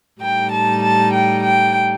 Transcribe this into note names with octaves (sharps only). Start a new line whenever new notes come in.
A2 G3 D#4 G5
A5
A5
G5
G5